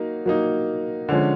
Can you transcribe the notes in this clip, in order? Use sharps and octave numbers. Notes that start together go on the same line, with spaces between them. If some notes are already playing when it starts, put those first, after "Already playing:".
Already playing: F#3 A#3 D#4
F#3 A#3 D#4
D3 F3 G#3 C#4